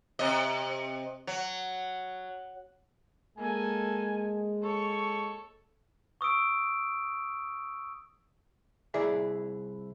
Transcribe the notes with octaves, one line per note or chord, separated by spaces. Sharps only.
C3 D#5
F#3
G#3 A#3 A4 G#5
A4 C#5 C#6
C#6 D#6 E6 D7
C2 E4 G#4 D5 E5